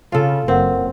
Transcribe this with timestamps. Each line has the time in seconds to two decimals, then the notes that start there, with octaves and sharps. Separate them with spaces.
0.12 C#3 F4 A4
0.48 F#1 C4 A#4 F#5